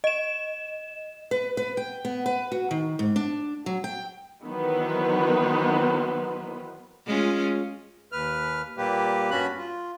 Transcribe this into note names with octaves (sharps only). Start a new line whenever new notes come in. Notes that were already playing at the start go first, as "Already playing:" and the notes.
D#5 E7
B4
B4
G5
B3
B4
F#4
D#3
G#2
D4
F#3
G5
D#3 E3 F#3 B3 B4 C5
G#3 C#4 F4
D#2 B4 F6
A#2 G3 A#3 G4 B4
G2 B3 C#4 F#4 B5 F#6
F4